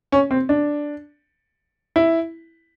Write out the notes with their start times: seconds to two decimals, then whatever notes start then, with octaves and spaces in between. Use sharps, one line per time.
0.12 C#4
0.31 C4
0.49 D4
1.96 E4